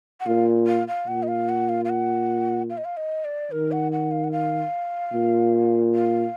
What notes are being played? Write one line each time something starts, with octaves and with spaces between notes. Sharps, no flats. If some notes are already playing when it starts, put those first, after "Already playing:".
F#5
A#2 F5
F5
F5
A#2 F#5
D#5
F5
F#5
F5
F5
F#5
F5
D#5
F5
D#5
D5
D#3 A#4
F#5
F#5
F5
F#5
F5
A#2
F5